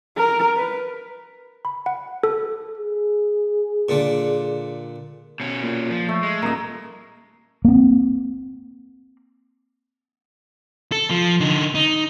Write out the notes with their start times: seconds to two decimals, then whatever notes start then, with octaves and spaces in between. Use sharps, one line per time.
0.17 A#4
0.57 B4
1.65 B5
1.86 F#5
2.23 A4
2.78 G#4
3.89 A#2 D3
5.40 B2 C#4
5.62 A#2
5.90 F3
6.09 A3
6.23 G#3
6.42 D#1 A#2 A#4 D#5
7.65 A#3 C4
10.92 A4
11.11 F3
11.40 D3 D#4
11.75 D#4